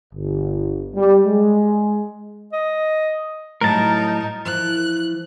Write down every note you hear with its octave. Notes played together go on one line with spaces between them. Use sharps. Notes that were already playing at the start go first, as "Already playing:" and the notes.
G1
G3
G#3
D#5
A2 F#3 G3 D#4 A#4 A5
E3 F3 F#6